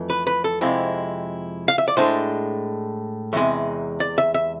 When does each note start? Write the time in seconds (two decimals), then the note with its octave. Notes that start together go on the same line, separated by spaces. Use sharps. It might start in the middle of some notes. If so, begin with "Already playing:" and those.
Already playing: F2 E3 A3
0.10 B4
0.27 B4
0.44 A4
0.61 F2 C3 G#3 C4 E4
1.68 F5
1.78 E5
1.88 D5
1.97 A2 G#3 D4 C5
3.33 E2 C3 G#3
4.00 D5
4.18 E5
4.34 E5